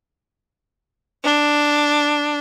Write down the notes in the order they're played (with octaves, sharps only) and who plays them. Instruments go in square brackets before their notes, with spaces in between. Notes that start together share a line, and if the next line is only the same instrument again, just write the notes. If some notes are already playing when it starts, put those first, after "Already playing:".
[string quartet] D4